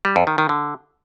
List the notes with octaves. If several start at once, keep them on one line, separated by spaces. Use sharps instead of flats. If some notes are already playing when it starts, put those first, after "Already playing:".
G3
F2
D#3
D#3
D3